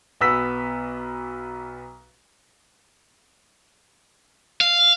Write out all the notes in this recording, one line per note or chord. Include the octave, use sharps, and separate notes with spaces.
B1 B3 E6 B6
F5